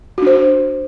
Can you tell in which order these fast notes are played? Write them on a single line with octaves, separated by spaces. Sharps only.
F#4 D4 C5